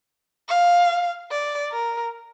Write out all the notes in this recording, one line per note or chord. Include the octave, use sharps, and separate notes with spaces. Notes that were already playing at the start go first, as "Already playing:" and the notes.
F5
D5
A#4